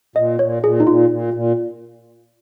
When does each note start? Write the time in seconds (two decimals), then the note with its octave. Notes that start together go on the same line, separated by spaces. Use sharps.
0.16 A#2 D#5
0.39 A#2 C#5
0.63 A#2 G#4
0.80 D#4
0.87 A#2 F4
1.09 A#2
1.34 A#2